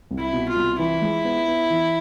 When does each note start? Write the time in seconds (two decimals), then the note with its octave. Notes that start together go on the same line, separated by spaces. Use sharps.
0.11 C2
0.18 E4
0.33 B2
0.48 F4
0.56 C2
0.78 E3 E4
1.02 G#3
1.25 B3
1.47 B3
1.70 E3